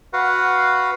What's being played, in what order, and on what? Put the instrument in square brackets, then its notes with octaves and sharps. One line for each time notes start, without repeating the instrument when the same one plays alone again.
[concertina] F#4 B4 F5 F#5